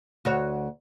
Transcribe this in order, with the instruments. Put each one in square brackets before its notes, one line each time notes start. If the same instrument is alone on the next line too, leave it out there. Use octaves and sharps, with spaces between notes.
[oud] D2 F#4 C#5